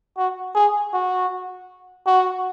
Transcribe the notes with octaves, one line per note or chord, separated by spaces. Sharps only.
F#4
G#4
F#4
F#4